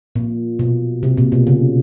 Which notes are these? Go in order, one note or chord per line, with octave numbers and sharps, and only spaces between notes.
A#2
B2
C3
A#2
B2
C#3